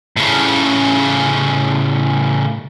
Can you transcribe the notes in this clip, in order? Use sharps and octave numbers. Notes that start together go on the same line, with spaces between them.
A2 C#3